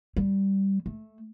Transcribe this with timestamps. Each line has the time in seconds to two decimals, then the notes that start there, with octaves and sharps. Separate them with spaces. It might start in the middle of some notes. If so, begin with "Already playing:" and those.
0.17 G3
0.86 A3